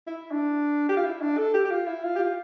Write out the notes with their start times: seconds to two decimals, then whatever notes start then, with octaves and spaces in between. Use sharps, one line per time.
0.07 E4
0.31 D4
0.89 G4
0.97 F4
1.04 E4
1.21 D4
1.37 A4
1.54 G4
1.64 G4
1.71 F4
1.87 E4
2.03 F4
2.15 G4
2.19 F4